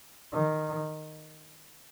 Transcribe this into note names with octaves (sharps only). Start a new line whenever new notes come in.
D#3